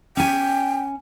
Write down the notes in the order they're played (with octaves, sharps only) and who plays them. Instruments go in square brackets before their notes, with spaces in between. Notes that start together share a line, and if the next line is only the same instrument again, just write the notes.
[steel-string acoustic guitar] C#4 G#5 [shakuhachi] G5